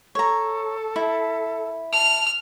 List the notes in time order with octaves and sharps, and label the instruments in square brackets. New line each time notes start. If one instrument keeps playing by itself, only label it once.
[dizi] A4 [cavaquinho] C#5 A#5
[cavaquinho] E4
[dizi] A5 [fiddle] F6